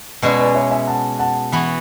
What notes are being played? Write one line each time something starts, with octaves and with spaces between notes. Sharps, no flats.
B2 G#3 C#4 E4 B4 D5
B4 D5
C#5 E5
E5 G#5
F#5 A5
F#5 A5
E3 B3 F#4